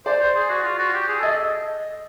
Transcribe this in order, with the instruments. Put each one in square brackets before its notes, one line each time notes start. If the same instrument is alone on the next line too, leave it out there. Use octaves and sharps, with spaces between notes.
[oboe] C5 [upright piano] D5
[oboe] C5
G#4
F#4
F4
F#4
G4
G#4
[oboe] A4 [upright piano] D#5